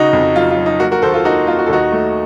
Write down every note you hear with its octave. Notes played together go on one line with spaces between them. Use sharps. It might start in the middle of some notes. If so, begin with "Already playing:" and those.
Already playing: C#3 D#4 F#4
F2
F#3 F4
F4
F#3
D#4
A#3 F#4 A#4
F#4 A#4
D#2 A4 C5
F4 A4
A#3 D#4 F#4
A#3 F4
F#4
A4
D#2 D#4 F#4
A3